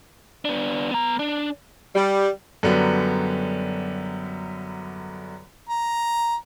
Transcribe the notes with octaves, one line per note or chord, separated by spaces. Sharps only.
B3 D4
B3 A#5
D4
G3
F#2 D3 F#3 G3 B3
A#5